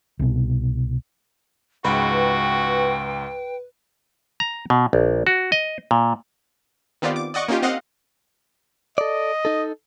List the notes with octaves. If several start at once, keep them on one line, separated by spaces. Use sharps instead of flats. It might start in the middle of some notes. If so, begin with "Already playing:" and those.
C2 B2
C#2 G#2 F#4 B4 G5
A#5
B2
A#1
F#4
D#5
A#2
D#3 B3 C4 F4 G4 D5
D6
D5 D#5 F#5 C#6 D6
A#3 C#4 D#4 F4 G4
C4 D#5 F5 F#5 C6
A4 D5 D#5
D#4 A4